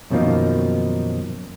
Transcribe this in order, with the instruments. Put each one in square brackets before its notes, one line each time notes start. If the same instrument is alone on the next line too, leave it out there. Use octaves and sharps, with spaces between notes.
[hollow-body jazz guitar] F#2 B2 D#3 F3 A#3 D#4